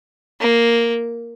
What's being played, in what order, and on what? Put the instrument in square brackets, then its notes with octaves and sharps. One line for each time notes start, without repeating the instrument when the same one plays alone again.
[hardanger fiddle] A#3